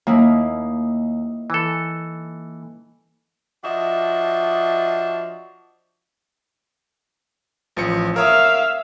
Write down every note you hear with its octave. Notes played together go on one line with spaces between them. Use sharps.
D#2 A#3 D#4 E4
E3 A4
F3 D4 F#4 D#5 E5
A1 F3 C#7
A#4 C#5 E5 F5 D#6